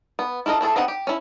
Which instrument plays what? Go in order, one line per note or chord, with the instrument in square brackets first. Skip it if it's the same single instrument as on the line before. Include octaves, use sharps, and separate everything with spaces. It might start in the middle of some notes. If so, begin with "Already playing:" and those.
[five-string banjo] B3
E4 F4 A4 A#4 D#5
A3 E4 G#4 A4
B3 C4 D#4 F#5 B5
G4
C#4 E4